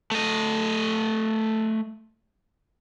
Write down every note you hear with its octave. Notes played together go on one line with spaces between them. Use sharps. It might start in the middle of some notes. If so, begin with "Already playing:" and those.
A3 D#5